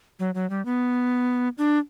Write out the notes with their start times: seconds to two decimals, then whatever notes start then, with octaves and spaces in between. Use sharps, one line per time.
0.19 F#3
0.35 F#3
0.50 G3
0.65 B3
1.58 D4